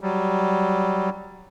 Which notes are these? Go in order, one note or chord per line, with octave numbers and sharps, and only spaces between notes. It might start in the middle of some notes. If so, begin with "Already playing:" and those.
F#3 G3